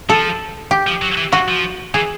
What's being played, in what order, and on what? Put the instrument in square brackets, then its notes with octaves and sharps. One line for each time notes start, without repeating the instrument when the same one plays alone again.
[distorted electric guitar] F3 [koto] A4
[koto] G4
[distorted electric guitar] F3
F#3
E3
[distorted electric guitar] E3 [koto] F#4
[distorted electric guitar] F3
[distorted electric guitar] E3 [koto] G#4